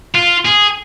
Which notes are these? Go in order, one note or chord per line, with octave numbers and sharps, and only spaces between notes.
F4
G#4